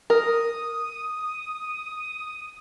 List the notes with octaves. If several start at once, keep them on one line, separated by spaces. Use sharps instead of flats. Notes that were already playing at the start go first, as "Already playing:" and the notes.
A#4 D#6